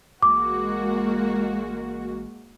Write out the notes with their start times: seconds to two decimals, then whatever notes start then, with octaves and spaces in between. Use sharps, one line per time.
0.23 A1 G#3 A#3 F#4 D6